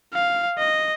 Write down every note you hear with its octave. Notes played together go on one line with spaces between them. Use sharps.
F5
D#5